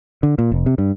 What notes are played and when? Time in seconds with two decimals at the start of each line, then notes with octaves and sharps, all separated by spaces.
0.23 D3
0.38 A#2
0.52 F1
0.66 C3
0.78 G2